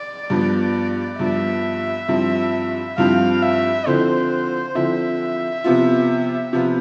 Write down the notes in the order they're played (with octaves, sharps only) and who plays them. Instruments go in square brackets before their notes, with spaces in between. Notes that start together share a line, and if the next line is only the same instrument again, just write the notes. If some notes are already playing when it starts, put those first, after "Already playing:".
Already playing: [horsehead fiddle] D5
[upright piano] G2 F3 B3
[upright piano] G2 F3 B3 [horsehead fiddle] E5
[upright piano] G2 F3 C4 E4
[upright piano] G2 F3 C4 E4 [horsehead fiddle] F5
[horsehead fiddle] E5
[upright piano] D3 F3 C4 E4 [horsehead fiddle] C5
[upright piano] D3 F3 C4 E4 [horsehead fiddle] E5
[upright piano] C3 F3 B3 F4
C3 F3 B3 F4